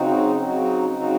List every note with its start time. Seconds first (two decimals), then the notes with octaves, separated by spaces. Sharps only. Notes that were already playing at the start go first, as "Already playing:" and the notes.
Already playing: C#3 F#3 C4 D#4 F#4
0.43 C#3 F#3 C4 D#4 F#4
0.96 C#3 F#3 C4 D#4 F#4